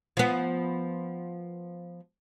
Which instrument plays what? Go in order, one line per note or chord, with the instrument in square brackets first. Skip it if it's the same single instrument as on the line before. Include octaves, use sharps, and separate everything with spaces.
[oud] F3 B3